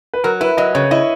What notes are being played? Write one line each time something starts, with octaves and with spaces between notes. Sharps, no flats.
B4
F#3 A#4
E4 B4
F#3 D#5
C#3 C#5
E4 D#5